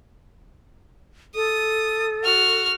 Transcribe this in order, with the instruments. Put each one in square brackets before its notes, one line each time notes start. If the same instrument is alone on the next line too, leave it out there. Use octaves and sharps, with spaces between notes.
[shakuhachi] A4 [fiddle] D#6
[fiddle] F#4 F6